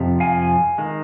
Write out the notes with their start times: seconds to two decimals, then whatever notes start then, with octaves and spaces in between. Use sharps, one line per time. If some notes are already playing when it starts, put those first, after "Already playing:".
Already playing: F2 C3 F3
0.20 F5 G#5
0.78 D#3 G#3